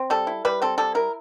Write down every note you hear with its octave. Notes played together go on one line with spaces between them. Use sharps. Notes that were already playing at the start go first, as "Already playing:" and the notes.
Already playing: C4
G3 A4
E4
G3 B4
C4 A4
G3 A4
E4 A#4